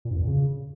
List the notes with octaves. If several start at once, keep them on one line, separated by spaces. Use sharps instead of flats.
A#2
G2
F2
A#2
C#3